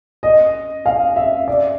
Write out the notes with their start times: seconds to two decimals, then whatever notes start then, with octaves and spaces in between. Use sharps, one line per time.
0.23 D#5
0.86 F5
1.16 E5
1.48 D5